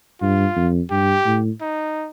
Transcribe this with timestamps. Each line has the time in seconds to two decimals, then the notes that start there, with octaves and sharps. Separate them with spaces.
0.21 G2 F4
0.56 F2
0.91 G2 G4
1.26 A2
1.61 D#4